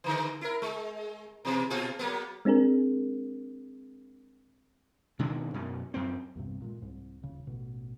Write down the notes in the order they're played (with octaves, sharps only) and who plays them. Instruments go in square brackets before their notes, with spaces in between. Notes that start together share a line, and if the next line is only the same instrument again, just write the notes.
[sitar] G#2 D3 E3
E4 A#4
G#3
B2 E3
A#2 F4 G#4
F#3 A#3 B3
[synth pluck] G#3 C4 D4 G#4 A#4
[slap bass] B2 D#3 G#3 D4
F#2 B2
F#2 C4
[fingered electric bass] B1 E2 G2 C3
A#2 F#3 G#3
C2 G#2
D#1 C#3
A1 B2